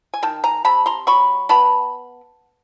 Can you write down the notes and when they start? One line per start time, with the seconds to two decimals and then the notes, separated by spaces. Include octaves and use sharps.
0.14 G#5
0.22 D#3 G5 A5
0.44 G#5 A#5
0.65 C3 A5 B5
0.86 A#5 C6
1.07 F#3 B5 C#6
1.49 B3 A5 B5